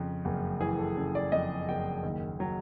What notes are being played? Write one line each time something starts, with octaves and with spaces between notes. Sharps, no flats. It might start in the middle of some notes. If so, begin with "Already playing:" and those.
Already playing: F2 C#3
F#1
E3 G#4
A4
C#3 A4
D5
F2 D#5
F#1 G5
D#2
F#3